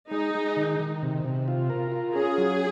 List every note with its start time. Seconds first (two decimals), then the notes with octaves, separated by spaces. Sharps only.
0.11 G#3 D#4
0.35 G#3
0.57 D#3
0.79 D#3
1.03 C3
1.25 C3
1.48 F4
1.70 A#4
1.92 F4
2.15 C#4 G#4
2.38 F#3